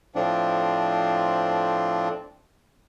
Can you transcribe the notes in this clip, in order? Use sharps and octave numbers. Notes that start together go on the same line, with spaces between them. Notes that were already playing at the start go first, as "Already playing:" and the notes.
A2 F3 C4 D4